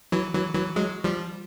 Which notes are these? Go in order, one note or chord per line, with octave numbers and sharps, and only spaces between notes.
E3 F#3
E3 F#3
E3 F#3
F#3 G#3
F3 G3